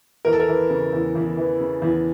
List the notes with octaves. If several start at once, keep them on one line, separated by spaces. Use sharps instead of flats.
E2 A#4
A4
A#4
E3
C#3
E2
E2
E3
C#3
E2